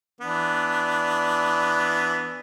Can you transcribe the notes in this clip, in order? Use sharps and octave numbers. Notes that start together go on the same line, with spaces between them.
E3 B3 D4